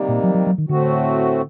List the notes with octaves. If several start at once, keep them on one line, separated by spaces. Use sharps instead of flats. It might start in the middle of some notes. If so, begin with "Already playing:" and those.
Already playing: C3 D#3 G3 A#3
A#2
F#3
F#3
F#3
D#3
A2 D3 A3 C4 F#4